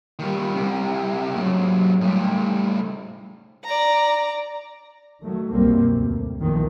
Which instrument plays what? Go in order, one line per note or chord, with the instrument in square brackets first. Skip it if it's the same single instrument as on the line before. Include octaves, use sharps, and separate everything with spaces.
[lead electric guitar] D#3 G3
C2 C3
G#2 F#3
A2 G3
[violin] D5 A#5
[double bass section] D#3 F#3 A3
C2 F#2 B2 G3 A#3 C4
D2
B1 E2 A#2 D#3 F3